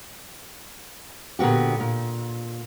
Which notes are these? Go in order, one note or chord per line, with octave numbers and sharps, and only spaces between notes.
A#2 D3 B3 F#4 G4
A#2